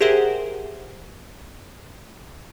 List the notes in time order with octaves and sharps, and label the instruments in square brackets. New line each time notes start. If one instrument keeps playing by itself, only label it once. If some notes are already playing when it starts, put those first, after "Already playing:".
[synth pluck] G4 G#4 A#4 C5 E5 F#5